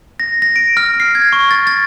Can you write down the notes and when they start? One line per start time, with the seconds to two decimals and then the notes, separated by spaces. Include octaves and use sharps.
0.20 A#6
0.42 A#6
0.56 D7
0.77 F6
1.00 C7
1.15 G#6
1.33 C#6
1.51 A6
1.67 A6